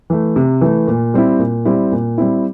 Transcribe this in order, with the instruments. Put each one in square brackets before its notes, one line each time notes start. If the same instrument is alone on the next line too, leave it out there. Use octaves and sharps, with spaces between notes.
[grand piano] E3 A3
C3
E3 A3
A#2
G3 C4 E4
A#2
G3 C4 E4
A#2
G3 C4 E4